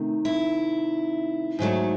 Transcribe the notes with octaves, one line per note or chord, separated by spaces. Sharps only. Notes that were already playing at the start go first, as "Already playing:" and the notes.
Already playing: C3 D#3 A3
E4
G#2 D#3 F#3 A3